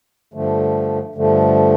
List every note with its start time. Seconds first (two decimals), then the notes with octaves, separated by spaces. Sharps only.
0.34 G2 D3 F3 A3
1.15 G2 D3 F3 A3